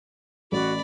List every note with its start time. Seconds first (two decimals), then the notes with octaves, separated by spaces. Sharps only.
0.52 A1 F#4 D5 B5